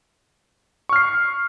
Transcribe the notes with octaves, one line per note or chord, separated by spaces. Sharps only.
C#6 F6 C7